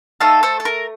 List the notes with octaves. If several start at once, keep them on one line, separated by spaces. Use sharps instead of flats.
A3 D#4 A4 F5 A5
A4 C5
A4
A#4